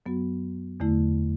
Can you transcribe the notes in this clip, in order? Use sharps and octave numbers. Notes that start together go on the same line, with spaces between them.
F#2 F#3 B3 F#4
E2 D3 A3 E4